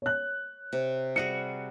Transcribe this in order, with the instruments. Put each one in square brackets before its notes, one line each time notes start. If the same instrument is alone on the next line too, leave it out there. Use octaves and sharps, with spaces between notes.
[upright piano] C#5 F#6
[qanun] C3
[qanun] G3 F#4 G#4 [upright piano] C#7